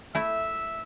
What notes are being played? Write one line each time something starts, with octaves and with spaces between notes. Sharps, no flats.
A3 E4 E5